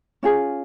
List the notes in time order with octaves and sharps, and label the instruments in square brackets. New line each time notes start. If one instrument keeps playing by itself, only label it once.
[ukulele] C#4 F4 G#4